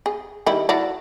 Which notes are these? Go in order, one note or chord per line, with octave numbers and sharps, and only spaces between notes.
G#4
D#3 G3 E4
E4 F#4 D5